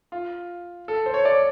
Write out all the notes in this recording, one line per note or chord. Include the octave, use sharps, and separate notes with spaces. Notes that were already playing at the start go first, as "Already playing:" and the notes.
F4
A4
C5
C#5
D5